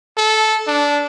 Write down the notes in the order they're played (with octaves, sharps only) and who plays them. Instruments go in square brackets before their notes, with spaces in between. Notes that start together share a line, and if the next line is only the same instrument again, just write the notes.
[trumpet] A4
D4